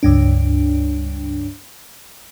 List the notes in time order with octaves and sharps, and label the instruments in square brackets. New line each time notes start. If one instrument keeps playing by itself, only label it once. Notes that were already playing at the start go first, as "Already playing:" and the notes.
[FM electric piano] C#2 G2 D4